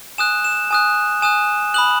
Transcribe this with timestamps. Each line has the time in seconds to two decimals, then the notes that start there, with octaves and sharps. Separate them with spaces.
0.18 G#5 D#6 F#6 E7
0.44 E7
0.71 G#5 D#6 F#6
1.22 G#5 D#6 F#6 E7
1.74 B5 D#6 F#6 F#7